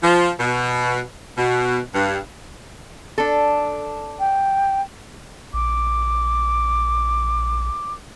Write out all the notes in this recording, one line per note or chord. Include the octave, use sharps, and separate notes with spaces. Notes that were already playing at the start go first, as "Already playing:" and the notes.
F3
B2
B2
G2
D4 A4
G5
A#1 D6